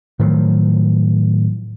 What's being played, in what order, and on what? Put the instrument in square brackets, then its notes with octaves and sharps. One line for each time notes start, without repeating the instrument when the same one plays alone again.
[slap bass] A2 D#3 F3 F#3